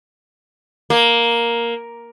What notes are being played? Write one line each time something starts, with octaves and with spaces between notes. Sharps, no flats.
A#3